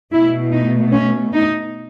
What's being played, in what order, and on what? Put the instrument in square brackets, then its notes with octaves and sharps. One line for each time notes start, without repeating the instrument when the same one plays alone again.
[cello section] B2 A3 E4
D#4
C#4
D#4